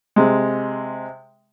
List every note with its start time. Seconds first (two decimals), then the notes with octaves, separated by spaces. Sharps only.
0.16 C3 G#3